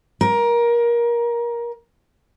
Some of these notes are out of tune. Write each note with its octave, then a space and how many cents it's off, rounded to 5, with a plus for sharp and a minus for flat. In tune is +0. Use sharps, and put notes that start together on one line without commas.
A#4 +20